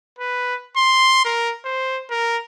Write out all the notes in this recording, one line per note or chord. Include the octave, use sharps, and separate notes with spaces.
B4
C6
A#4
C5
A#4